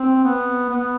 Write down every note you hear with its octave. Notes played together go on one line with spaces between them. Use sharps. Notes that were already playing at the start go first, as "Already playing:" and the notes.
Already playing: C4
B3
B3